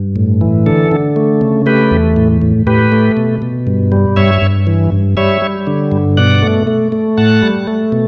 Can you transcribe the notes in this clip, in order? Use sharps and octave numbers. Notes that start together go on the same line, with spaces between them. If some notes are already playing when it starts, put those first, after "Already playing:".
Already playing: G2
A2
E3
D3 A4
D3
A3
C#3
A3 G4 B4
E2
A2
A2
A2 G4 B4
A3
B2
B2
G2
G3
G2 C#5 E5
G2
E3
G2
G3 C#5 E5
G3
D3
G2
B2 D5 F#5
A3
A3
A3
A2 F#5 A5
G3
A3
B2